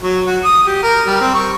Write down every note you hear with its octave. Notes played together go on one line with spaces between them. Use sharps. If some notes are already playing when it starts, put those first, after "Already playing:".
F#3
F#4
D#6
G4
A#4
G3
C4
C#6